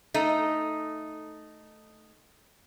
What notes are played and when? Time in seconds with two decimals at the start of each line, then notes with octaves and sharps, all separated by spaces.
0.14 A3 D#4